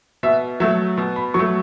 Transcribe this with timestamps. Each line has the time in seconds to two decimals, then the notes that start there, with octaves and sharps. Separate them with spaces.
0.23 B2 E5
0.60 F#3 A3 E5
0.97 B2
1.16 B5
1.34 F#3 A3 C#6